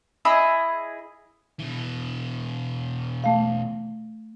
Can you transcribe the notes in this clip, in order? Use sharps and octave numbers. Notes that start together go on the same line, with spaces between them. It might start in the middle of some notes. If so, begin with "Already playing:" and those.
E4 G#4 D#5 E6
B2 E3
A3 F5